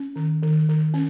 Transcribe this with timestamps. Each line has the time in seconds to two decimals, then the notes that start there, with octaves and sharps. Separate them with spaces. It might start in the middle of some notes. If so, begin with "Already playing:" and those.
Already playing: C#4
0.16 D#3
0.43 D#3
0.69 D#3
0.94 C#4